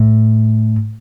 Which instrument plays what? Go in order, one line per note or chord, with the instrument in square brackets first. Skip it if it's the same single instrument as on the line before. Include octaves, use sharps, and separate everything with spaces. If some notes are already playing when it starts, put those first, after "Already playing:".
Already playing: [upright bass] A2